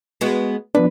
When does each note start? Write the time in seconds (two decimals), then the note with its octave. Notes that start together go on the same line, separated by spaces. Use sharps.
0.21 G#3 B3 F#4
0.75 F3 B3 D4 B4